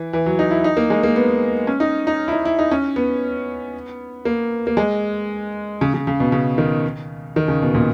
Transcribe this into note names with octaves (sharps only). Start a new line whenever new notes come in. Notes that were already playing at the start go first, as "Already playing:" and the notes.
Already playing: E3
E3
F#3
D#4
E4
D#4
A#3
G#3
A#3
B3
C#4
D#4
D#4
E4
D#4
E4
D#4
C#4
B3
A#3
A#3
G#3
C#3
C#3
C#3
B2
C#3
D#3
D#3
C#3
B2
A#2